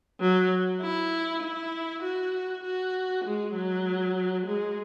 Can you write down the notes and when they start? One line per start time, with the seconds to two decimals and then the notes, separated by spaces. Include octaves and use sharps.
0.20 F#3
0.81 E4
1.42 E4
2.03 F#4
2.63 F#4
3.25 G#3
3.55 F#3
4.46 G#3